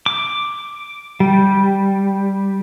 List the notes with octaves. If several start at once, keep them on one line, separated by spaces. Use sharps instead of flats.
D6
G3